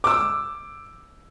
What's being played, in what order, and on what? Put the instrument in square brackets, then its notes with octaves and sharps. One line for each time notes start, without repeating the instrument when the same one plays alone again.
[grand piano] D6 E6